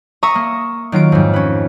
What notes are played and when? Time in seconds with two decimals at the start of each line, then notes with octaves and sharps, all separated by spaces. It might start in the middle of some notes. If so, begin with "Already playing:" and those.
0.23 E5 A#5 C#6 D#6 C#7
0.35 A#3
0.92 D#3 F#3 F4 D7
1.12 F2 G#2
1.33 C#4 B4